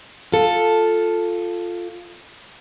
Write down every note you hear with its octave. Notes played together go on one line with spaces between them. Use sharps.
F4 A4